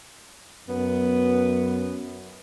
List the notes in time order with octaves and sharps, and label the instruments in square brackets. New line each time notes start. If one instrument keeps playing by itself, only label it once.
[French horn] F#2 [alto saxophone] B3